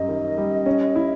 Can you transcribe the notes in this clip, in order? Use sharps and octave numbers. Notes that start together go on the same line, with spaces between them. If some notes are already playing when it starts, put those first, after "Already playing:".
Already playing: F#2 G3 D#5
D#3
G3
C#4
E4